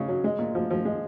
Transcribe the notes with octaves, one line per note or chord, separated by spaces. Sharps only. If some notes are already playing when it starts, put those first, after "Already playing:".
Already playing: C#3 D#4
F#3
G#3
A#2
F3
F3
G#3